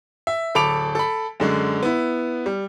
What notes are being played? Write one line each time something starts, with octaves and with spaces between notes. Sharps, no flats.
E5
D1 A4 B5 D6 D7 F7
A4 B5
F#2 D3 G#3
B3 E4
G3